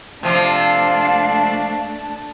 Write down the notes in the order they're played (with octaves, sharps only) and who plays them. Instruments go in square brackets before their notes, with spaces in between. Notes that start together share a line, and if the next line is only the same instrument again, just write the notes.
[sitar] C3 F3 [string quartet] A3 D4 A5 [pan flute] F5